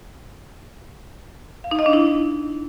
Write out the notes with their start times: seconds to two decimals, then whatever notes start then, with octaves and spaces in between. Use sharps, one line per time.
1.64 F5
1.71 D#4
1.79 D#5
1.86 D4
1.93 E4